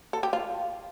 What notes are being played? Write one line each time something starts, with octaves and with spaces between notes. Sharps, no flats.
A4
G4
F4